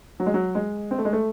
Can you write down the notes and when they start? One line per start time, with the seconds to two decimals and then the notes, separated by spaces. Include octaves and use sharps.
0.20 F#3
0.26 G#3
0.34 F#3
0.55 G#3
0.91 C4
0.98 A3
1.05 G#3
1.13 A3